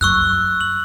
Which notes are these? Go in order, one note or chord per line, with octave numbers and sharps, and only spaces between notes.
F#2 F#3 C#6 E6 F#6
F#7